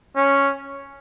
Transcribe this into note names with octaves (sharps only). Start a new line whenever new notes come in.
C#4